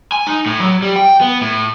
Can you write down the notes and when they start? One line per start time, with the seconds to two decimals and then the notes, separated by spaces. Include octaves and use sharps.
0.12 G#5
0.27 D#4
0.46 A2
0.60 F#3
0.82 G3
0.96 G5
1.21 B3
1.41 A2